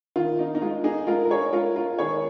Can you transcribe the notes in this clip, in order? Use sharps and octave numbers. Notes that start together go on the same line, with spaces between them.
D#3 F4
D#4
D#4
G#3 F4
D#4 G#4
G#3 F4 A#4
A#4
G#4 C#5
G#3 F4 A#4
F4 A#4
D#3 G#4 C#5